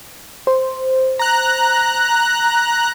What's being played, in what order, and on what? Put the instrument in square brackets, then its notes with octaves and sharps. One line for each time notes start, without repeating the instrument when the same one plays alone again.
[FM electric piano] C5
[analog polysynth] A#5 F#6